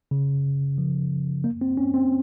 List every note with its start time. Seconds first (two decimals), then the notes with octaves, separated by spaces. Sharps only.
0.11 C#3
0.78 F3
1.44 A#3
1.61 C4
1.77 C#4
1.94 C4